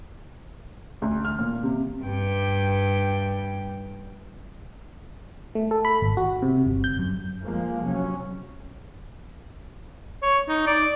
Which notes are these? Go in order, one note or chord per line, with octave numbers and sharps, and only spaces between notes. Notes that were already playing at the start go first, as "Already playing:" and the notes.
D2
F6
A#2
C3
G2 G5
A3
A4
B5
G#1
F#4
C3
G1
G6
F#2
F3 G#3 A#3
C3 F#3 C#4
C#5
D#4
D5